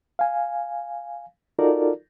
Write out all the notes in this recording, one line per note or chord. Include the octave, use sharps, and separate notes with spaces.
F5 G#5
D#4 F4 F#4 A4 A#4 D5